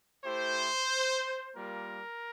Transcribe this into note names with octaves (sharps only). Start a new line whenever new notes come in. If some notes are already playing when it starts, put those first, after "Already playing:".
A3 E4 G4 C5
G3 A#3 F4 A#4